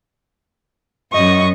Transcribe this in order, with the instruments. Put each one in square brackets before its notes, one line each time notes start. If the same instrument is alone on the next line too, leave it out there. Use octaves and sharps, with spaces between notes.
[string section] F#2 [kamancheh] D#5 C#6